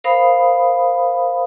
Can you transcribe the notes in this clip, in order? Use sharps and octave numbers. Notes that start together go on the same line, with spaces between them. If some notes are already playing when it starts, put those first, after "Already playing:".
A#4 C5 F5 B5 D#6